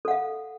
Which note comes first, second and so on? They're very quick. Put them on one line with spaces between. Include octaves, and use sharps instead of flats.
A4 F#5 F5